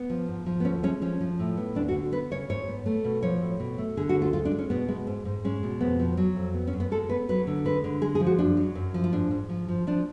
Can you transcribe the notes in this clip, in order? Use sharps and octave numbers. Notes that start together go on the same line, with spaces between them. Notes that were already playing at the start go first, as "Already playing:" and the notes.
Already playing: B3
F3
G#2
F3
B3
D2 C#4
G#3 C#4
F3 C#4
F3
A2
B3
D2 D4
F#4
D3
B3 B4
C#3 C#5
G#2 C#5
B3
A3
B2
F3 C#5
A2
B2
A3
D3 G#4
F#4
D2
F4
G#3 F4
D4
G#3
C#4
B2 B3
G#3
G#2
G#2
G#3 C#4
B2
F2 B3
F3
F#3
F2
B3
C#4
F#2
B3
G#3 A4
B3 B4
F#3 B4
D3
G#3 B4
D3
G#3 G#4
G#4
F3
F#4
F#2 D4
F#3
F#2
F3
F4
G#2 D4
G#2
F3
F3
F3 D4